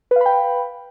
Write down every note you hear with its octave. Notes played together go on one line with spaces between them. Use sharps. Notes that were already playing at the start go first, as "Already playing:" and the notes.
B4 F5 G5 B5